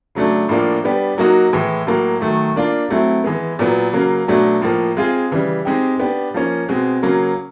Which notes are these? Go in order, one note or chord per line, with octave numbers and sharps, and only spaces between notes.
C#3 F#3 A3 D4
A2 F3 A#3 D4 F4
G3 B3 D4 G4
F#3 A#3 D#4 F#4
A2 E3 G#3
A2 F#3 A#3
D#3 F#3 A3
A#3 D4 F4
F#3 A3 C4 E4
E3 G#3 B3
A#2 F#3 B3
C#3 F#3 A#3
B2 F#3 A3 D4
A2 F3 A#3
G#3 C4 F4 G#4
C#3 E3 G3
G#3 C4 D#4 G4
B3 D4 G4
F3 A#3 C#4
B2 G#3 C4
C#3 F#3 A#3 C#4